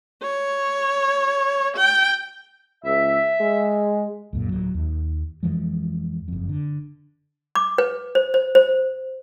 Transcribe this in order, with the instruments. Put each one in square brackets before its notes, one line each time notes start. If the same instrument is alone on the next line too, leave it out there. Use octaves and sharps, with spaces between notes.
[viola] C#5
G5
[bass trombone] C#2 [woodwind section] E5
[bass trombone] G#3
[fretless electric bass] C#2 F#2 A#2
D1 F#3
D#2
F2 E3 F3 G#3
F#1 F2
D3
[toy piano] D6
B4
C5
C5
C5